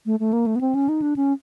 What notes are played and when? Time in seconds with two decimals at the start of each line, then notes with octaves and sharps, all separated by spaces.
0.06 A3
0.20 A3
0.33 A#3
0.46 A3
0.56 B3
0.61 C4
0.75 C#4
0.89 D#4
1.02 D4
1.16 C#4